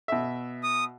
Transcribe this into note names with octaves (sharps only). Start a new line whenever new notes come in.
B2 E5
D#6